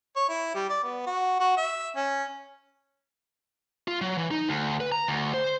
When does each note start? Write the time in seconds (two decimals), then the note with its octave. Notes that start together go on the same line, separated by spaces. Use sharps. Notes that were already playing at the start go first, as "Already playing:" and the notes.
0.16 C#5
0.29 E4
0.55 G3
0.70 D5
0.84 B3
1.07 F#4
1.40 F#4
1.57 E5
1.96 C#4
3.88 F4
4.01 F#3
4.18 E3
4.31 D#4
4.49 D2
4.80 B4
4.92 A#5
5.08 D2
5.34 C5